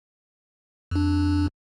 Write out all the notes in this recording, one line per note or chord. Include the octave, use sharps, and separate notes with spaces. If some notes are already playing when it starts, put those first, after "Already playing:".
F2 D4